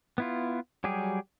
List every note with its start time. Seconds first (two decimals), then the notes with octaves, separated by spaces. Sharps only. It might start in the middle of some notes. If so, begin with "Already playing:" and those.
0.18 B3 E4 F4
0.84 F#3 G3 G4 G#4